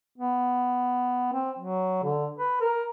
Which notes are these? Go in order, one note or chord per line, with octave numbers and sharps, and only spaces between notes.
B3
C4
F#3
D3
B4
A#4